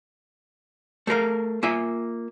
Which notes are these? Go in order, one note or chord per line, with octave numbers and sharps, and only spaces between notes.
A3 G#4 A#4 F5
A#3 F4 E5 G#5